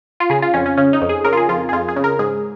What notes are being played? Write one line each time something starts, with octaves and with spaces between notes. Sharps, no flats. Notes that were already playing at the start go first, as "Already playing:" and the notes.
F4
C#3 G#4
F4
F2 C#4
C#4
C#3 C#4
D#4
F2
G#4
C#3 A#4
F4
G#4
F2 F4
G#4
F2 F4
G#4
C#3
A#4
G#2 G#4